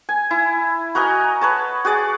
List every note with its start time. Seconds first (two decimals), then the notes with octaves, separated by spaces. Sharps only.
0.09 G#5
0.31 E4
0.95 F#4 A#4 D#5 G#5
1.41 B4 C#5 A5
1.85 F#4 G#4 D5